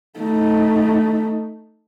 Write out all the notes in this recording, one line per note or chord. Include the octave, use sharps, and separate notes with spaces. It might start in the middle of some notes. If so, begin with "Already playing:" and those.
A3 D#4